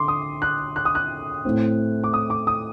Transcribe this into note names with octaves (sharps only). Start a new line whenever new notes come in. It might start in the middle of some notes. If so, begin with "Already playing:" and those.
Already playing: D3 C6 D6
D#6
F#6
F#6
D#6
F#6
A2 A3 C4
D6
D#6
D6
D#6